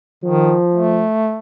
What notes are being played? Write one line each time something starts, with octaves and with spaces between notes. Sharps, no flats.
D#3 F3
A3